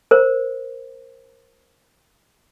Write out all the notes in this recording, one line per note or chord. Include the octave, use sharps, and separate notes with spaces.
A#4 C5